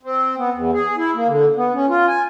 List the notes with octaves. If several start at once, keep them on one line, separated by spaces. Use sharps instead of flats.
C4
B3
E2
G#4
E4
A#3
D3
B3
C#4
F4
G#5